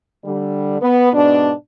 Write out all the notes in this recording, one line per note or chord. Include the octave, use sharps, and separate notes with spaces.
D3 G3
B3
G#2 B2 D4